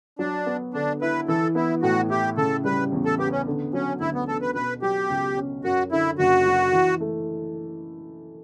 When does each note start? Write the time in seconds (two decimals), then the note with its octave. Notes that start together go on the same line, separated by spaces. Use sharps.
0.19 F#3 D4
0.46 B3
0.74 D3 D4
1.01 E4 B4
1.28 E3 A4
1.55 B3 E4
1.82 A2 F#4
2.10 E4 G4
2.37 C#3 A4
2.64 G3 B4
2.92 E2
3.05 A4
3.19 B3 G4
3.32 C#4
3.47 D3
3.73 F#3 C#4
4.00 D2 E4
4.15 B3
4.27 B3 A4
4.42 B4
4.55 B2 B4
4.82 F#3 G4
5.10 C#2
5.37 C#4
5.64 F#2 F#4
5.92 D3 E4
6.18 F#1 F#4
6.46 F#3
6.73 E3
7.00 A3